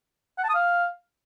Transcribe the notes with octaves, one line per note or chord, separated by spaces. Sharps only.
F#5
A5
D#6
F5